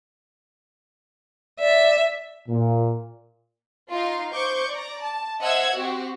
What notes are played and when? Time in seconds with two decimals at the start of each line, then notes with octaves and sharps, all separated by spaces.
1.60 D5 E5
2.48 A#2
3.91 D#4 F4 F5 C6
4.32 C5 C#6 D6 G6
4.70 D5 A#5
5.03 A5
5.42 C5 D#5 E5 F#5 E6 G#6
5.75 C4 F#4 G4